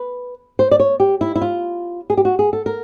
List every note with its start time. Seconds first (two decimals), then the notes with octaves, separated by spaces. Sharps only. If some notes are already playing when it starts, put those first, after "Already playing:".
Already playing: B4
0.59 C5
0.71 D5
0.80 C#5
1.00 G4
1.21 E4
1.35 E4
1.41 F4
2.10 G#4
2.17 G4
2.25 F#4
2.39 G#4
2.53 A4
2.66 A#4